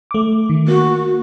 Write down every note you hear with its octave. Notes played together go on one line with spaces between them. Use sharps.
A3 D6
D#3
A#3 F#4